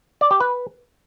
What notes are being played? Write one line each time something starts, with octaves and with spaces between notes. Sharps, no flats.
D5
G4
B4